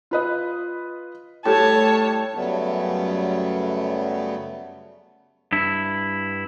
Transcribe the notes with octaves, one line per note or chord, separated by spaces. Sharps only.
F4 B4 D#5
A2 G3 G4 C#5 A5
F#2 C#3 F#3 G3 A3 B3
G2 E4